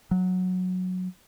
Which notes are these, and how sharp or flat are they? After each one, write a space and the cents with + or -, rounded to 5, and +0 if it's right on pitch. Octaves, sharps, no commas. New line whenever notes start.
F#3 -10